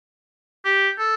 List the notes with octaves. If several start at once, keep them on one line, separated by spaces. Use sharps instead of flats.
G4
A4